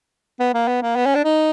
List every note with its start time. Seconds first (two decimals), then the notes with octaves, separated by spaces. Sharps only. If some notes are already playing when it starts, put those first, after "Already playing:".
0.39 B3
0.54 A#3
0.67 B3
0.82 A#3
0.96 B3
1.06 C#4
1.15 D4
1.24 D#4